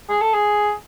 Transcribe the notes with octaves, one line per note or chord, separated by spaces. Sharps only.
G#4
A4
G#4